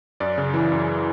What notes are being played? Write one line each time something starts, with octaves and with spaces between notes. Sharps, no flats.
F#2 D5
C#3
E3
F#2